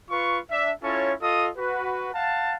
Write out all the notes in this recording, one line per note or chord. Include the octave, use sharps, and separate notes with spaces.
F4 B4 C#6
D4 E5
C#4 E4 F4 A4 C#5
F4 A4 D#5 D#6
F#4 B4
F5 F#5 A5